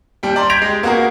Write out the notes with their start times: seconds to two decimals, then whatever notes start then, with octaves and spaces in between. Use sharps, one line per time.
0.23 D#2 G3 G5
0.36 D5 A#5 C6
0.50 G6 G#6 A#6 B6 D7 F7
0.62 G#3 G4
0.83 A#3 B3 F#4 G#4 A#4